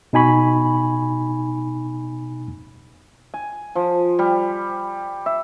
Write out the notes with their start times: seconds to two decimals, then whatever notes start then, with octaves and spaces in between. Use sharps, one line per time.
0.13 B2 D#4 G#5 B5 C#6
3.34 G#5
3.75 F3
4.19 G3
5.26 E5